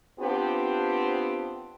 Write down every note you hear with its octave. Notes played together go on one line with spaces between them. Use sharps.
B3 C4 D4 F4 G4